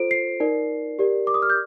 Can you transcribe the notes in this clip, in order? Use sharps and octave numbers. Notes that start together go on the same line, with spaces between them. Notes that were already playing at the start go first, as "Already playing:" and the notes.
Already playing: F4 A4 C5 D7
C7
D#4 A#4 D5
G4 A#4 D5
D6
D#6
F6
G6